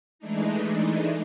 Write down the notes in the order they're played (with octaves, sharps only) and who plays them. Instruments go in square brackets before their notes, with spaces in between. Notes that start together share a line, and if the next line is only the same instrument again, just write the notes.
[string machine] E3 G#3 A3 D4 D#4